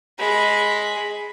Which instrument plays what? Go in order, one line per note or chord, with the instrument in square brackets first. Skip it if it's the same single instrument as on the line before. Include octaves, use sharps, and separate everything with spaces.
[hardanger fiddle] G#3 B5